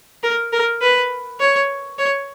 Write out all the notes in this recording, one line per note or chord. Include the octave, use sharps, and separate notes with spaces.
A#4
A#4
B4
C#5
C#5